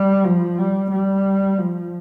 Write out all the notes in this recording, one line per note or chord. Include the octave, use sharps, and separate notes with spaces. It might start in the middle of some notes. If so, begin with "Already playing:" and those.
Already playing: G3
F3
G3
G3
F3